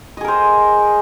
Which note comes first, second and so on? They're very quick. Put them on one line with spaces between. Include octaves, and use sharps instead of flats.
D#5 G#4 A#4 C5